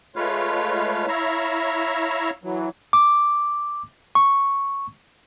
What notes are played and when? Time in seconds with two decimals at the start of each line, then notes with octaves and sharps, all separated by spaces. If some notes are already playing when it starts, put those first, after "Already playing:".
0.16 G#3 A3 F4 B4 C#5 F5
1.07 E4 C#5 E5 F5 A#5 E6
2.44 E3 F#3
2.93 D6
4.15 C#6